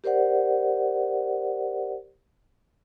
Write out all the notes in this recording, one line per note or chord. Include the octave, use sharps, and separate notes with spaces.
G4 A#4 C5 D5 F#5